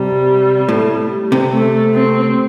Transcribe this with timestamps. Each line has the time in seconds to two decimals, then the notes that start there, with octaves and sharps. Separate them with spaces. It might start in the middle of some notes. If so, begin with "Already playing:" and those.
Already playing: C3 G3
0.69 A2
1.32 C3
1.53 A3
1.95 C4